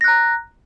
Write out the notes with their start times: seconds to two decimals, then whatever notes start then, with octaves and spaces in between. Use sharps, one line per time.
0.01 A#6
0.04 F#6
0.08 A#5